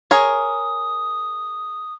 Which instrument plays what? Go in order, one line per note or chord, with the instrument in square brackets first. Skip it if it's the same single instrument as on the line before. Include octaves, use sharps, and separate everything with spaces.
[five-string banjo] G#4 A#4 C#5 [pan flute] D#6